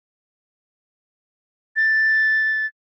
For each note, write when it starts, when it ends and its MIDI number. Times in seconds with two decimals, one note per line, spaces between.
1.76 2.66 93